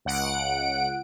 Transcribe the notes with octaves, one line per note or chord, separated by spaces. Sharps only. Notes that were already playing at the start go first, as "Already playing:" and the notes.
C#2 F#5 D7